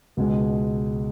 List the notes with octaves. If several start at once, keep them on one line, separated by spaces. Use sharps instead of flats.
C#2 B2 G#3